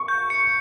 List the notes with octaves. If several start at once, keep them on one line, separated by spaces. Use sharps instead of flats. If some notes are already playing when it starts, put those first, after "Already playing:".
Already playing: C#6
G6
C#7